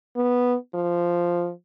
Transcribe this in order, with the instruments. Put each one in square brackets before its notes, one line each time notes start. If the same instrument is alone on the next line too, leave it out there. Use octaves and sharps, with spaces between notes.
[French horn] B3
F3